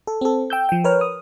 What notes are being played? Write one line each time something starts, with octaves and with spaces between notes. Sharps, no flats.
A4
C4 A4
G5 E6 G6
F3 G5
A#4 B4 C#5 F6
D#6